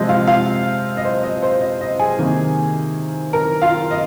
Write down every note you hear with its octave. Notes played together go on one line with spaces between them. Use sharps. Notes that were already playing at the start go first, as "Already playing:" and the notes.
Already playing: C3 F3 G#3 C4 D#5
F4 F5
F4 F5
D#5
C5
D#5
C5
D#5
D#5
G#4 G#5
C3 D#3 A#3
A#4 A#5
F4 F5
D#5